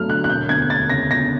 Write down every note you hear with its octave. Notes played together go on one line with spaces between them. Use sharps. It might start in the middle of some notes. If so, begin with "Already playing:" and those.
Already playing: G2 F#3 A3 F6
D3 F#6
F#6
E1 G6
D2 G#6
E1 A6
C#3 A#6
E1 A#6